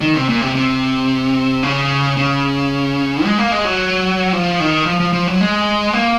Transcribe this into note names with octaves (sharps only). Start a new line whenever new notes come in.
D#3
C3
A#2
C3
C3
C#3
C#3
G#3
A#3
G#3
F#3
F3
D#3
F3
F3
F3
F#3
G#3
A#3